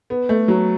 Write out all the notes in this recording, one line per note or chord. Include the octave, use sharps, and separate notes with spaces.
B3
A3
F#3